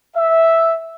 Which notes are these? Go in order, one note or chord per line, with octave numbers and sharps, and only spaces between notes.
E5